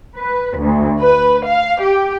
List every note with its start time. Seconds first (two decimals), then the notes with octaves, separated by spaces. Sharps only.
0.16 B4
0.59 D2
1.00 B4
1.46 F5
1.80 G4